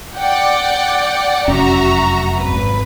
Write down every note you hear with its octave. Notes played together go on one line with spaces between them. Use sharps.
D5 F#5 G5
F1 F#2 C#4 F#4 E5 A#5
G#1 B4